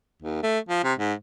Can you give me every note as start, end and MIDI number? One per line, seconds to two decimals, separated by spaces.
0.22 0.40 39
0.43 0.59 57
0.69 0.81 53
0.84 0.93 48
0.98 1.13 44